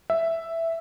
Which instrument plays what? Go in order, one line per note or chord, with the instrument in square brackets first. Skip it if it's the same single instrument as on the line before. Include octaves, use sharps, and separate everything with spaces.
[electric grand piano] E5